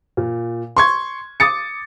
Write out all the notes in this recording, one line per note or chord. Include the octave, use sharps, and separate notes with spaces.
A#2
C6 C#6 G#6
D6 D#6 A6 C#7